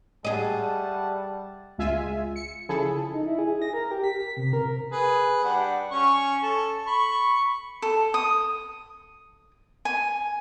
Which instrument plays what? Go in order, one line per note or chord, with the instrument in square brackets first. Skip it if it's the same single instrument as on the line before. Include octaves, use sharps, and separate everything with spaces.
[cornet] G3 [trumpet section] A3 F#5 A5 [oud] G#4 D#5
[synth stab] C#2 G#3 F4 E5 G#5
C#7
C#3 F3 E4 G#4 A4
[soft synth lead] D#4
E4
G#4
A#6
A#4
G4
B6
C3
A#4
[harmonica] G#4 B4
G3 D4 F#5
C#4 G#5 C#6
A4
B5 C#6
[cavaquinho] A4
D#6
G#5